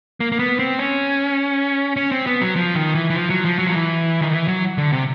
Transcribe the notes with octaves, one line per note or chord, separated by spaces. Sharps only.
A#3
A#3
B3
C4
C#4
C#4
C4
B3
F#3
F3
D#3
E3
E3
F3
F#3
F3
F#3
F3
E3
D#3
E3
F#3
D3
C3